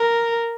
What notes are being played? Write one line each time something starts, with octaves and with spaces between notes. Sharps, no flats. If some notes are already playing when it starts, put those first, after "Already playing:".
Already playing: A#4